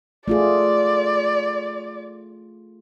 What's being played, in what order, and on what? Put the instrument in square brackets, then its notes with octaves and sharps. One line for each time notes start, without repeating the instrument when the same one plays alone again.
[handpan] A3 F4 G#4 [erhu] D5